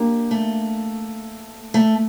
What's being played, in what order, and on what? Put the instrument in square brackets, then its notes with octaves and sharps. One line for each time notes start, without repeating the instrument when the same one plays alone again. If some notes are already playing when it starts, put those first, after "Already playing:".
Already playing: [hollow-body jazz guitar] A#3 D4 G4
[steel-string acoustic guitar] A3
A3